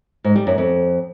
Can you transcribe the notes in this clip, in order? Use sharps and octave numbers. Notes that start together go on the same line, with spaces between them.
G#2
G3
F#2
F2